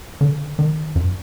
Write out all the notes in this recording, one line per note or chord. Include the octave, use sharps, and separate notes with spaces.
D3
D#3
F#2